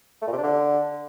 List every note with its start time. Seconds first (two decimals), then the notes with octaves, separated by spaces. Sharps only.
0.22 A3
0.27 A#2
0.32 C3
0.38 D4
0.43 D3